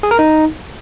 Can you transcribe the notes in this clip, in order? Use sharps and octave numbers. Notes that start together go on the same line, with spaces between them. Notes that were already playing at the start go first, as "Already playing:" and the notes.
G#4
A#4
D#4